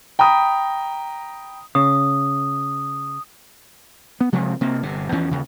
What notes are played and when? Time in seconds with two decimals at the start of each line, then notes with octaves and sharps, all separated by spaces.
0.19 G5 A#5 B5 D#6
1.75 C#3 D#6
4.21 B3
4.32 C3 F3 G#3 C4
4.61 C3 A#3 C4
4.83 G1 C3
5.12 E2 E3 F3 C#4
5.31 D#2 C#3